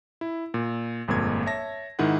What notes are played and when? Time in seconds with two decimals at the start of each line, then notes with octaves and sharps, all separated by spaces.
0.21 E4
0.54 A#2
1.08 G1 F2 A#2 G#3 A#3 G#6
1.46 C#5 E5 A5 A#6
1.99 G#2 D#3 E4 G#4 D#5 F#5